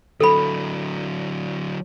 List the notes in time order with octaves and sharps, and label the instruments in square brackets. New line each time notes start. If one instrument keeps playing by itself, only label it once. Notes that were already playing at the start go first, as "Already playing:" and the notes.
[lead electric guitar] D3 F#3 [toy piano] A4 B5